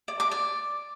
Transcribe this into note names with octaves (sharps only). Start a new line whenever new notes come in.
D5
D6
D5